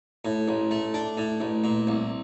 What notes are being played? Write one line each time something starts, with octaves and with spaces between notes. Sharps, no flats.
A2
A1
A3
D4
A2
A1
A#2
C2